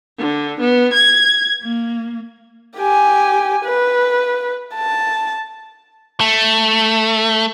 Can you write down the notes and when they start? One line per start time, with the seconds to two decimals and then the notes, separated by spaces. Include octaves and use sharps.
0.18 D3
0.61 B3
0.93 G#6
1.63 A#3
2.78 G4 G#5
3.65 B4
4.75 A5
6.20 A3